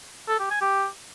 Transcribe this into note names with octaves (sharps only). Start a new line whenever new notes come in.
A4
G4
G#5
G4